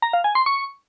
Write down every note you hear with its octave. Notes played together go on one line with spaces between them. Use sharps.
A#5
F5
G#5
C6
C#6